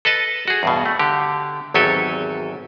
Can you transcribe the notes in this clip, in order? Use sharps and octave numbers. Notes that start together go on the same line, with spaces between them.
A4 B4 D#5 A5
F#4 G#4
E2 G2 B2
A3
D3 G4
G#1 E2 F#3 G4 A4 G#5